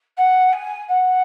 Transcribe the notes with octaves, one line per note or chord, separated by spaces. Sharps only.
F#5
G#5
F#5